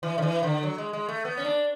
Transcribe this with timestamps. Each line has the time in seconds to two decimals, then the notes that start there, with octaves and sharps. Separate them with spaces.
0.03 E3
0.18 D3
0.22 E3
0.43 D3
0.63 F#3
0.78 G#3
0.93 G#3
1.09 A3
1.25 B3
1.37 C#4
1.45 D4